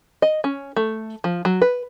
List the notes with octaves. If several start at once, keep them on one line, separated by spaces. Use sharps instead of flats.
D#5
C#4
A3
F3
F#3
B4